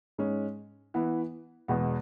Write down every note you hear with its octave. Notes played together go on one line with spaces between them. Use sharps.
G#2 G#3 C#4
E3 B3 E4
E2 B2 G#3 B3